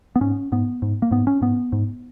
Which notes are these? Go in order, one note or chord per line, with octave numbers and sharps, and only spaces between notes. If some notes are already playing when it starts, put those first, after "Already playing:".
B3
G#2 C#4
G#2 B3
G#2
A#3
G#2 B3
C#4
G#2 B3
G#2